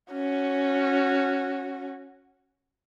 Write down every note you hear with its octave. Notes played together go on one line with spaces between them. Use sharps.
C#4 F#4